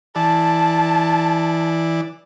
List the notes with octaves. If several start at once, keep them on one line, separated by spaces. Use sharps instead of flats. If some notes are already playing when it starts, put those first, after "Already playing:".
E3 D5 A5